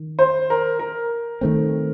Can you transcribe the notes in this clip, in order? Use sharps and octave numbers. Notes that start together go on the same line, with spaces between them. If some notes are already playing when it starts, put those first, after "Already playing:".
Already playing: D#3
C5
A#4
A#4
D#3 A3 C4